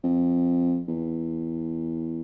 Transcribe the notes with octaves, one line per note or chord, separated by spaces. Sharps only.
F2
E2